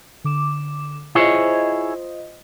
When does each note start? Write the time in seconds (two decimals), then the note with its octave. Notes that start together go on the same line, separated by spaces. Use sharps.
0.24 D3 D6 E7
1.15 E4 F4 G#4 C5 C#5 D#5